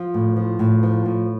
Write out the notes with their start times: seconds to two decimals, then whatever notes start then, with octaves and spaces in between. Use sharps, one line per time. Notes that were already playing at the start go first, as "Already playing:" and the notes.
Already playing: F3
0.14 A2
0.36 F3
0.59 A2
0.83 F3
1.05 A2